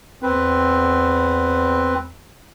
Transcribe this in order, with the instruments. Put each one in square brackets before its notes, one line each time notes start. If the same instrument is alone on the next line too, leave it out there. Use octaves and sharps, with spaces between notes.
[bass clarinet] E2 [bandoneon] C4 B4